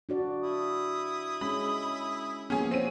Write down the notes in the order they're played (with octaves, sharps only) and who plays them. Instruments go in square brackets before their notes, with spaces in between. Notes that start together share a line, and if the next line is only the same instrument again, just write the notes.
[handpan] D4 F#4 D5
[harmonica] E4 D#6
[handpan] G#3 C#4 [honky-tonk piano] B5
[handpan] F3 A#3 B3 [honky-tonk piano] C#4 G#4
[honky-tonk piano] C4 D#7 [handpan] B4 C#5